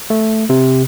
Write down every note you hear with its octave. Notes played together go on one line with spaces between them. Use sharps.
A3
C3